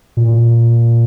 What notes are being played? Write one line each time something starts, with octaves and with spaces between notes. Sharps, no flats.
A#2